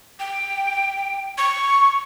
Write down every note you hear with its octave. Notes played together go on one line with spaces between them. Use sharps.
G5
C#6